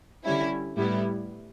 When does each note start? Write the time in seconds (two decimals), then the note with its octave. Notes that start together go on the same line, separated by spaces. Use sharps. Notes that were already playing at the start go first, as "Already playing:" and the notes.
0.25 D3 G3 C#4 E4
0.77 A2 G3 B3 E4